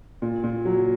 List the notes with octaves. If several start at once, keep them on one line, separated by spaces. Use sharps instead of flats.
A#2
A#2
F#3